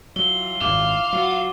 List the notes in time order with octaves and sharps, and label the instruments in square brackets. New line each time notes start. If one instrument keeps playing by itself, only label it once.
[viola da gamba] E3 F4 [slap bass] F#3 [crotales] G7
[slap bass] G#1 F#2 [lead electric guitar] F5 [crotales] D6
[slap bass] F#3 [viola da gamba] F4 F#4